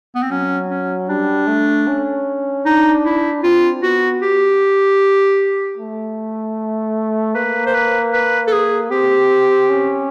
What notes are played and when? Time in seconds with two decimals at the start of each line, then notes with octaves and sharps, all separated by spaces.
0.15 B3
0.22 C4
0.31 F#3 C#4
0.70 C#4
1.09 G3 D4
1.47 A3
1.88 C#4
2.65 D4 D#4
3.04 E4
3.43 C4 F4
3.82 B3 F#4
4.22 G4
5.78 A3
7.35 A#3 B4
7.66 C5
7.74 B4
8.13 B4
8.47 A4
8.52 G#4
8.90 C4 G4
9.70 C#4